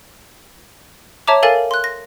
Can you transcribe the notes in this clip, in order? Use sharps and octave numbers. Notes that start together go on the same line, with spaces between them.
C#5 E5 A5 A#5 D6
A4 A#4 F5 G#5 A6
C6 F#6
A#6